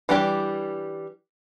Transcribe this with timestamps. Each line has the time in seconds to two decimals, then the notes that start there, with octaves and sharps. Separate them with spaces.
0.09 E3 G3 D4 G4 D5